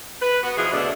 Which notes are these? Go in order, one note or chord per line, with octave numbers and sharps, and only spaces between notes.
B4
B3 F#4
B2 E3 F3 D4 G#4
E2 B2 D3 A3 B3 D4